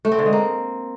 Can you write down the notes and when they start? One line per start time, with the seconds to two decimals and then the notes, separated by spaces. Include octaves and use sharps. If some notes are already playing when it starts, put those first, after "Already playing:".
0.05 A3
0.12 C4
0.19 D3
0.26 G#3
0.33 A#3